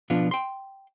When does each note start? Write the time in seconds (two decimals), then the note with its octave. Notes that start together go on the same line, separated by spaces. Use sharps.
0.10 B2 F3 B3 D4 F4
0.31 G5 C6